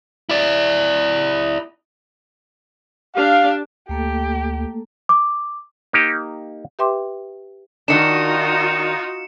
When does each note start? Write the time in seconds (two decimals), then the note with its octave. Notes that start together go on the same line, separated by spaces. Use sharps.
0.29 E4 D5
3.15 D4 G4 F5
3.89 D2 A3 A#3 G4 A4
5.09 D6
5.93 A#3 D#4 G4
6.79 G4 B4 E5 G5 C6 D6
7.88 D#3 D4 D#4 F4 F#4 C#7 E7